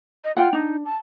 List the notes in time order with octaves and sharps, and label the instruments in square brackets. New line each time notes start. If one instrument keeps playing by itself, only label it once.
[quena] D#5
[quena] F4 [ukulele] F#5 G5
[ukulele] D4 [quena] D#4
[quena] A5